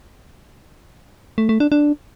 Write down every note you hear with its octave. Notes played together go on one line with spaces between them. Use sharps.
A3
A3
D4
D4